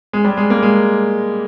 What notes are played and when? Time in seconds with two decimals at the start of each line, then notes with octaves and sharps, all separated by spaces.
0.13 G#3
0.24 G3
0.37 G#3
0.50 A#3
0.63 G#3